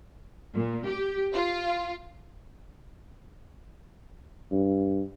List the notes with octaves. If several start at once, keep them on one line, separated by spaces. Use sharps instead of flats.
A#2
G4
F4
G2